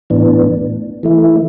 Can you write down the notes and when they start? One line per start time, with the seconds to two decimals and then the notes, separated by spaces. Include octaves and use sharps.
0.10 A2 E3 B3 D4
1.03 E3 A3 E4